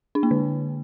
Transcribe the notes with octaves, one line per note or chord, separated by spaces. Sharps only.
D4
A#3
D3